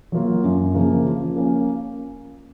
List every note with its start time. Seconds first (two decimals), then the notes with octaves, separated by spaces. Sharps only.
0.12 F#3 A#3 F4
0.44 F#2
0.74 C#3 F3 A#3
1.05 F3
1.36 A#3 C#4